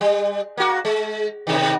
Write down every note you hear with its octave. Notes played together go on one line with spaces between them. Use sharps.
G3
A#3 F#4
G#3
B2 D#3